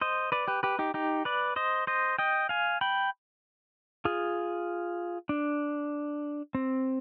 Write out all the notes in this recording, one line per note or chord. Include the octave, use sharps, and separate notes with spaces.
C5 D#5
B4 D5
G4 B4
G4 B4
D#4 G4
D#4 G4
B4 D5
C5 D#5
C5 D#5
D#5 G5
F5 G#5
G5 B5
F4 G#4
D4
C4